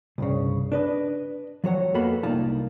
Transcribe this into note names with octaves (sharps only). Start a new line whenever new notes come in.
C2 G2 C#3
D4 B4 D#5
F3 F#3 C#5 F#5
F2 A#3 B3 F#4 A4 B5
C2 A#3 D#4 F4 A5